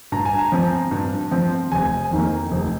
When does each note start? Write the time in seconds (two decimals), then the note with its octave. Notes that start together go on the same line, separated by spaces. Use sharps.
0.12 G2 A#5
0.25 G#5
0.39 A#5
0.52 F3 C4
0.91 G2
1.31 F3 C4
1.72 F1 G#5
2.11 F2 D#3 A#3
2.51 F1